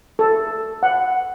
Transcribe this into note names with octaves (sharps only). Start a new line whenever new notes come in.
A4
F#5